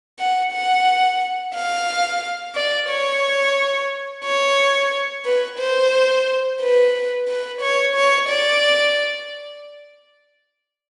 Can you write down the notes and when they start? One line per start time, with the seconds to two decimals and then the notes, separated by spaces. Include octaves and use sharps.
0.20 F#5
0.53 F#5
1.55 F5
2.55 D5
2.89 C#5
4.24 C#5
5.25 B4
5.59 C5
6.61 B4
7.28 B4
7.61 C#5
7.95 C#5
8.29 D5